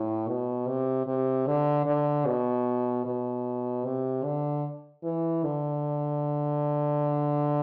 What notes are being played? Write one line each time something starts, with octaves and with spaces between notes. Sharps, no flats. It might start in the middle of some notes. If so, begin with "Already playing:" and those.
Already playing: A2
B2
C3
C3
D3
D3
B2
B2
C3
D3
E3
D3